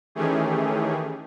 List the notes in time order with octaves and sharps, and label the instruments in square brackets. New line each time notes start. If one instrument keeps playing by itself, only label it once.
[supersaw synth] D#3 E3 A3 C#4 G4 G#4